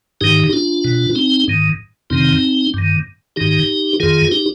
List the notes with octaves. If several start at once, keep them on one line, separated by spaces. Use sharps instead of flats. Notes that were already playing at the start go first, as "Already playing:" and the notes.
G#2 D#3 D#4 G4
D4 F4
B2
C4 D#4
G#2 D#3
F2 C3 D#3 C4 D#4
G2 D#3
G#2 D#3 D#4 G4
F2 D#3 F4 G#4
D#4 G4